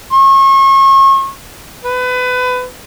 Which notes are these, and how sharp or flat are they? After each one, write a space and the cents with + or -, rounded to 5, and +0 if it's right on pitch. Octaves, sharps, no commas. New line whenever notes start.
C#6 -35
B4 +25